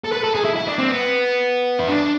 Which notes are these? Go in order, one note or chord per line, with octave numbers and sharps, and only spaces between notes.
A4
B4
A4
G#4
E4
E4
D4
C4
B3
E4
D4